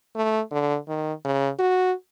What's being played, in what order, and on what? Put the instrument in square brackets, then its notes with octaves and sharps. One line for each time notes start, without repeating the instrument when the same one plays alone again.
[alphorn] A3
D3
D#3
C#3
F#4